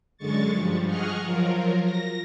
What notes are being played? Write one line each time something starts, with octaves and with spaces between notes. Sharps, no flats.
F#2 D3 G#3 C#6 A6
G2 F3 G3
G#4 D#5 F#5 C#6 F6
F3 F#3 F4 A#4
A#6